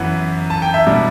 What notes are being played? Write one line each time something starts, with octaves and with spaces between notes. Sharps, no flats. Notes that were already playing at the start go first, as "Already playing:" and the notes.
Already playing: F#2 E3 B3 B4 F#5
A5
G5
E5
B2 G3 D4